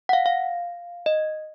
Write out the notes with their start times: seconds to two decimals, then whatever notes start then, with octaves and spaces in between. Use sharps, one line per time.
0.09 F#5
0.13 F5
0.26 F5
1.06 D#5